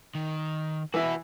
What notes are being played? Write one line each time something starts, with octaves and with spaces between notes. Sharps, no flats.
D#3
E3 E4 F#4 B4